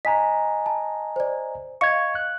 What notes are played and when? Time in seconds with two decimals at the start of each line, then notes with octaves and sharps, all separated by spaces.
0.05 D#5 G#5 A#5 B6
0.66 A5
1.16 C5 D5
1.81 D#5 F5 C#6 G#6 C#7
2.15 F#6